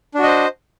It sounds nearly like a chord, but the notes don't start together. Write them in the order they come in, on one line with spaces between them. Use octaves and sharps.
D4 F#4 D#5 C5